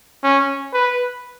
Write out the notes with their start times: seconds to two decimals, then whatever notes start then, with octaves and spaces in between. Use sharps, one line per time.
0.24 C#4
0.73 B4